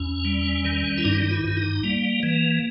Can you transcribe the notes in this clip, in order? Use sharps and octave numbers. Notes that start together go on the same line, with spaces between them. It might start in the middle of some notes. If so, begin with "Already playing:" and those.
Already playing: E2 C#4
G3
D#3
E4
G2 D#4
D#4
E4
G2 E4
D#4
G3 A#3
E3